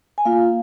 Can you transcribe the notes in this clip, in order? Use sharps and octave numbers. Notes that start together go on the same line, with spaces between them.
G#5
A#3 F4 F5